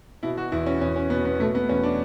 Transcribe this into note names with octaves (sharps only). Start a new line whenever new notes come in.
B2 E4
F#4
E2 E4
C#4
E2 C#4
C#4
B2 B3
B3
B2 A3
B3
E2 C#4
D4